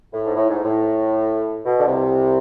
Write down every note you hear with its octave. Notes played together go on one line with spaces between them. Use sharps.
A2
G#2
A2
G#2
A2
B2
D3
C2 C3